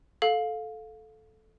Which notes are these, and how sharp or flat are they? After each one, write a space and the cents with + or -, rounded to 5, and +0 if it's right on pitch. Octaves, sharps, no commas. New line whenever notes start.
A4 -10 F5 +15